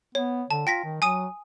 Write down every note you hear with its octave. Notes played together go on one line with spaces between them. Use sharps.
B3 C#5
D3 A5
F4 G5 A#6 B6
D#3
F#3 G#5 D#6 D#7